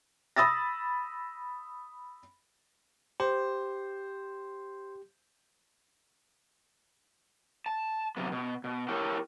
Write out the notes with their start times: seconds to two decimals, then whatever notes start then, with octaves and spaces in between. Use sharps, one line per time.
0.36 B5 D#6 E6 A6 A#6
3.20 G4 C5
7.66 A5
8.17 C3 F#3 B3
8.32 B2
8.64 B2
8.88 E4 G4 A4 A#4 C#5